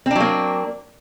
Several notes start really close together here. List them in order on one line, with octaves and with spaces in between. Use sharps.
C4 D4 F#3 A#3